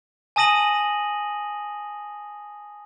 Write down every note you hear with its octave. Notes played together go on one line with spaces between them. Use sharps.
G#5 A5 D#6 A#6 D#7 F#7